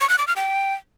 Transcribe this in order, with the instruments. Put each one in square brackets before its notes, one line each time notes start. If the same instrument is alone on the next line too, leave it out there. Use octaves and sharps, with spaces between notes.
[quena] C#6
F#6
D6
F6
G5